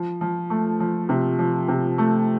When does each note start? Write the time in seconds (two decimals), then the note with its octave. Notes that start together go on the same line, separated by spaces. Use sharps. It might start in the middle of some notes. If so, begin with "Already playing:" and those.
Already playing: F3
0.21 F3
0.50 A3
0.80 F3
1.09 C3
1.39 F3
1.68 C3
1.98 A3